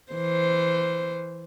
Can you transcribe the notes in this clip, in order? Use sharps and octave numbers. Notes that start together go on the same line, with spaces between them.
E3 C5